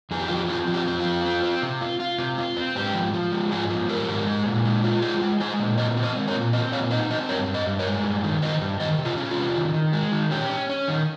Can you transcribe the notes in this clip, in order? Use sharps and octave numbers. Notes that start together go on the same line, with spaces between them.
F2 G#4
G4
F3 F4
G4
C4 F4 G#4
F3
G4
C4
F4
F2
C4
C4
C3
F4
F4
C3
F4
C4
G#2 G4
F3
F3
G#3
G#2 F4 G#4
F3
G#2 G4 A#4
G#2
G#3
A#2
G#3
F4
G#3 G#4 C5
G#3
G#3 G#4 C5
A#2
C4 C5 D#5
C4
C5 D#5
G#3
A#4 C#5
A#2
C4 C5 D#5
A#2 C#5 F5
D#4 C5 D#5
C4 C5 D#5
G2 A#4 C#5
G2
C5 D#5
G2
A#4 C#5
G#3
G2
D#3
D#3 C5 D#5
G2
D#3 C5 D#5
C3
F4 G#4
C#4
F4
C3
D#3
D#3
G#3
D#3
C#4 G4
C#4
C#4
D#3